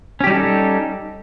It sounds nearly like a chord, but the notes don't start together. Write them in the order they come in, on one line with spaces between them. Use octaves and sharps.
C#4 G4 G3 D#4 A4